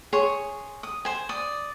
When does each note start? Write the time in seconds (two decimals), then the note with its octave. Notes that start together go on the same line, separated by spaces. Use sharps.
0.13 G#4 C#5 C6 C#6
0.83 D#6
1.05 C5 G#5
1.29 D5 D#6